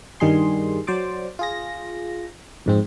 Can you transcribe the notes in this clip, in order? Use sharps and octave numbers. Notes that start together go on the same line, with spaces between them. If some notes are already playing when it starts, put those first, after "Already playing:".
G2 D#3 G3 G#4 C6
F#3 C5 D5 D6
F4 G#4 A#6
F2 G#2 C4